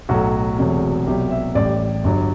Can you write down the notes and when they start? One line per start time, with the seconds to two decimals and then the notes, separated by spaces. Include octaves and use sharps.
0.09 B1 A2 F#3 A3 F#4
0.58 E1 E2 C3 F#3 A3
1.07 C2 B2 F#3 G4
1.30 E5
1.55 A1 A2 G3 D5
2.04 G1 G2 F#3